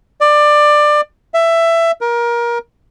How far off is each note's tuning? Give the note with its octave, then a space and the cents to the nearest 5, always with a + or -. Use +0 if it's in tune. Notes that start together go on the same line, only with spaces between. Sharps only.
D5 +20
E5 +15
A#4 +25